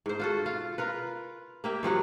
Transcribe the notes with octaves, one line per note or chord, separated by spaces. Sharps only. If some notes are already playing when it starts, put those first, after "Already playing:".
G#2 C5
F4 F#4 A4
F4
F4 A#4 B4
A#3 G4 E5
G2 F3 F#3 F#5